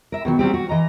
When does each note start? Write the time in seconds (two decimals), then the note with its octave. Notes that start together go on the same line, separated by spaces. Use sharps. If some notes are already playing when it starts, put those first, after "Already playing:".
0.12 A#4 E5
0.25 B2 D#3 F#3
0.39 F#3 G3 C4 G4
0.54 F#4
0.69 E3 D#5 A#5